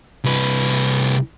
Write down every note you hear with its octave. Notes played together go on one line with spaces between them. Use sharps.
C2 B4